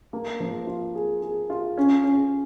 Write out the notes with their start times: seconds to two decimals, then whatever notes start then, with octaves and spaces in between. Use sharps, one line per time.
0.13 A#3
0.40 F3
0.67 F4
0.95 G#4
1.22 G#4
1.50 F4
1.77 C#4
2.04 C#4